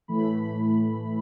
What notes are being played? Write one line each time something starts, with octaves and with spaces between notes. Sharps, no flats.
A2 E3 A3 B5